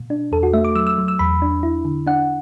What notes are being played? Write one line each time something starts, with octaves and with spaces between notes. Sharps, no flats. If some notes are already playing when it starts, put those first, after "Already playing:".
Already playing: B2
D4
E2 A4
F#4
A3 E5
D6
F#3 E6
E6
F#3
E6
E2 B5
D4
E4
D3
D4 F#5